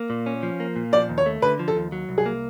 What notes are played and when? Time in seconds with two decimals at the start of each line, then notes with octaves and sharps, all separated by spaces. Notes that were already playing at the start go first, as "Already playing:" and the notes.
Already playing: A#3
0.10 A#2
0.26 C#4
0.43 F3
0.60 A#3
0.76 A#2
0.93 F3 D5
1.09 D#2
1.18 C#5
1.26 A3
1.42 D3 B4
1.59 F3
1.68 A4
1.76 D#2
1.92 F#3
2.09 C2
2.18 G#4
2.26 A#3